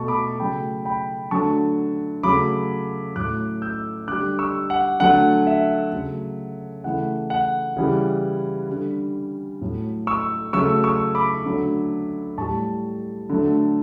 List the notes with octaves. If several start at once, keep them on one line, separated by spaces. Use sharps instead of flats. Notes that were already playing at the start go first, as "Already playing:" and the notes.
Already playing: B2 A3 A5 C#6
B5 D6
C#3 F#3 A3 G5 B5
G5 B5
D3 F#3 A3 A5 C#6
C#3 F#3 A3 B5 D6
A2 F#3 A3 D6 F#6
E6 G6
D3 G3 D6 F#6
C#6 E6
F#5
D3 F#3 A3 F#5
E5
C#3 F#3 A3
C#3 E3 A3 F#5
F#5
C#3 E3 G3
D3 G3
A2 F#3 A3
C#6 E6
C#3 F#3 A3 C#6 E6
C#6 E6
B5 D6
D3 F#3 A3
A2 G3 A5 C#6
D3 F#3 A3